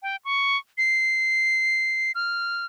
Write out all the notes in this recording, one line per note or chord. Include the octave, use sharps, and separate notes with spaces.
G5
C#6
C7
F6